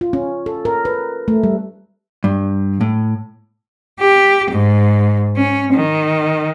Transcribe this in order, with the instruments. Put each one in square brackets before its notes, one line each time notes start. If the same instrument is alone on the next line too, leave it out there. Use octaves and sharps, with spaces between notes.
[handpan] F4
C#4
A4
A#4
B4
A3
G3
[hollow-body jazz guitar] G2
A2
[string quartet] G4
G#2
C#4
D#3